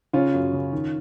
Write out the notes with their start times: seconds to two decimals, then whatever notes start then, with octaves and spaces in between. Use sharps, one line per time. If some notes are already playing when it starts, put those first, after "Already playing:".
0.13 C#3 C#4 F4
0.34 F#2
0.53 C#3
0.72 D#3